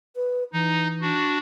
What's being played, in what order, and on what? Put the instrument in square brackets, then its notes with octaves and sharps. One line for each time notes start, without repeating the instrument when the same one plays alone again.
[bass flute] B4
[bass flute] E3 [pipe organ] D#4
[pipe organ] D4 F#4